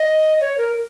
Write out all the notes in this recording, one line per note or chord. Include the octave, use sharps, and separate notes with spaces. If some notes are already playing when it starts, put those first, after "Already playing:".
Already playing: D#5
C#5
A#4